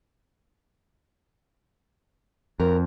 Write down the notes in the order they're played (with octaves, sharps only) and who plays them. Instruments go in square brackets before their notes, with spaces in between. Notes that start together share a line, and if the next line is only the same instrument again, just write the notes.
[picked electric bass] F2 [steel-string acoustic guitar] A#4